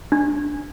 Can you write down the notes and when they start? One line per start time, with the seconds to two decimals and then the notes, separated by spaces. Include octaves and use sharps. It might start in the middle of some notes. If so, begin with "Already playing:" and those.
0.12 D4